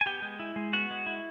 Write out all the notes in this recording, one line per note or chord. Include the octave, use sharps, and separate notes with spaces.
G#5
B3 G4 G5
G#3
E4
G#3
B3 F#4 F#5
G#3
E4